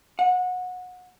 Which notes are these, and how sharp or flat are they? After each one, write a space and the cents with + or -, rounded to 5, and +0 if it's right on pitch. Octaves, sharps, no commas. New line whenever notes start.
F#5 -25